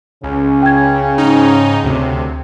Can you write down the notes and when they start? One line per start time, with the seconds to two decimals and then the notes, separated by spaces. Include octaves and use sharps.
0.23 C#2 C#3 C#4
0.62 G5 G#6
1.18 G#2 D#4
1.84 D2 C3